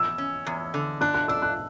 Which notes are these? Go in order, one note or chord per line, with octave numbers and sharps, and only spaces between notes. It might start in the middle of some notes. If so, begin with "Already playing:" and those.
Already playing: E2 E6
C#4
E2
D3
D4 F#6
F#6
D4 E6
F#6